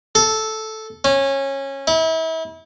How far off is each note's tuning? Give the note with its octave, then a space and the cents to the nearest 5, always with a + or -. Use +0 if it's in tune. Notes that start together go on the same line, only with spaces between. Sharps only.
A4 -5
C#4 -20
E4 -35